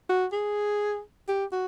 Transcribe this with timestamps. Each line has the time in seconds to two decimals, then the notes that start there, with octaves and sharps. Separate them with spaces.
0.09 F#4
0.33 G#4
1.28 G4
1.52 F#4